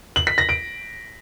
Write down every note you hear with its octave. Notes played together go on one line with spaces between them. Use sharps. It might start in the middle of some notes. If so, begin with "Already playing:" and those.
F#7
B6
A#6
D7